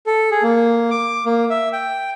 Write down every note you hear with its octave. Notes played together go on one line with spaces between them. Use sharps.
A4
G#4
A#3
D6
A#3
E5
G5